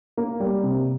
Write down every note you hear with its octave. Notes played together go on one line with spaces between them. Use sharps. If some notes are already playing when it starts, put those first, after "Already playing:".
A#3
G3
C3